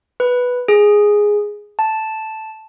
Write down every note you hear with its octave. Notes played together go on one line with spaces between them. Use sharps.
B4
G#4
A5